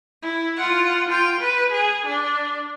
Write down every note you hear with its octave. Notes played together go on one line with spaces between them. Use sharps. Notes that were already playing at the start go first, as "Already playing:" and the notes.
E4
F4 F#5
F4 G5
B4
G#4
D4